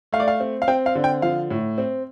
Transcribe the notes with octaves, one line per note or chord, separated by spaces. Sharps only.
A3 F5
D5
F5
C4
F5
C4 G5
F5
D3
G5
F3 F5
A2
C4